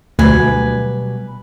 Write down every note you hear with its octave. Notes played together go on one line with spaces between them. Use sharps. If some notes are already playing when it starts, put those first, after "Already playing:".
D2 B2 F#3 G3 B4 G#5